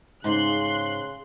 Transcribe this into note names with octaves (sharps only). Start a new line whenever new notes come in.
G#2 C#3 C6 F#6